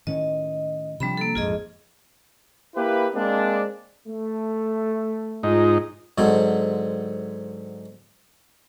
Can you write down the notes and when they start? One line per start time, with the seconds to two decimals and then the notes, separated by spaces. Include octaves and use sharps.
0.07 A2 D#3 C#4 D#5
1.00 C3 F3 G3 C4 D4 B5
1.17 A#3 A4
1.35 A#1 F2 G#2 F4 G#4 D#5
2.75 A#3 E4 G4 B4
3.14 G#3 A#3 C4 D4
4.07 A3
5.43 G#2 D#4 F4
6.18 G#2 D3 F#3 C4